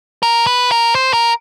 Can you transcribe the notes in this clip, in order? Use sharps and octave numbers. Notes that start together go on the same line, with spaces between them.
A#4
B4
A#4
C5
A#4